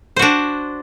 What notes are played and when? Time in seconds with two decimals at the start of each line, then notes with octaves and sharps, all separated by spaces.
0.16 C5
0.19 F#4
0.22 D4